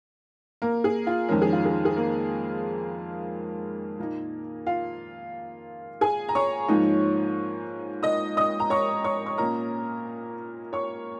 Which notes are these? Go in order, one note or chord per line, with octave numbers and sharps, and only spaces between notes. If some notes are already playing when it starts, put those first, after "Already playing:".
A#3 A#4
G#4
F4
F2 D#3 G#3 C#4 A#4
G#4
F4
G#4
G#4
A#3 A#4
A#2 A#3 D#4
F4 F5
G#4 G#5
A#5
C#5 C#6
G#2 F3 A#3 D#4
D#5 D#6
D#5 D#6
A#5
C#5 C#6
C#5 C#6
C#6
A#2 A#3 C#4 A#4 A#5
C#5 C#6